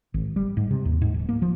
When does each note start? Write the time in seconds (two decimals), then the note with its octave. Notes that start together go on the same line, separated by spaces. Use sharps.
0.14 G#1
0.36 G3
0.57 G#2
0.71 C3
0.85 D#2
1.02 G#2
1.14 D1
1.29 A#3
1.42 F3